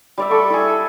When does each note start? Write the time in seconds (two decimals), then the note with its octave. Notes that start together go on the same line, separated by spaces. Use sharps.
0.18 G3 D5 E5
0.31 A4 C#6
0.50 E4 G#4